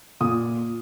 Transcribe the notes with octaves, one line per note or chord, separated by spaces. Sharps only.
A#2 D#6